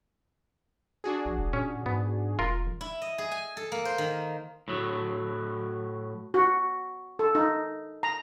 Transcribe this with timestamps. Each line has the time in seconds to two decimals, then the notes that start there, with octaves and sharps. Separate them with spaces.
1.04 D4 F#4 G#4
1.25 A#1
1.38 E1
1.53 A#2 C#4
1.86 G#2 B3
2.39 E1 F4 A#4
2.81 E4
3.02 D#5
3.18 G#4
3.32 G#5
3.57 A4
3.72 A#3
3.85 C5
3.98 D#3
4.68 A2 F#3
6.34 F#4
7.19 A4
7.35 D#4
8.03 A#5